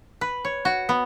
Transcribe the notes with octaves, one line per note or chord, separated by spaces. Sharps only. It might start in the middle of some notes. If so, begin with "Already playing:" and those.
B4
C#5
F#4
B3